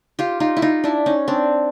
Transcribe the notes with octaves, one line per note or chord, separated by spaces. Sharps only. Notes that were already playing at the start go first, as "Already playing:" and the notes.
F4 G4
D#4 F4
E4
D#4 F4
D4 E4
C#4 D#4
C4 D4